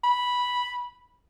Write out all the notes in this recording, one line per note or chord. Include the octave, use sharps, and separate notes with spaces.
B5